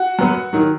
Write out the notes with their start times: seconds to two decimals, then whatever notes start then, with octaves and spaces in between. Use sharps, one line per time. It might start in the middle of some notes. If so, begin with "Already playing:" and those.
Already playing: F#4 F#5
0.19 F#2 F#3 B3
0.53 D#3 F#3